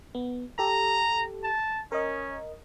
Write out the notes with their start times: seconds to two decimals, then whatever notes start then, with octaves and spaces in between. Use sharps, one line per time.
0.15 B3
0.59 G4 A4 A#5
1.44 A5
1.92 C#4 A#4 D#5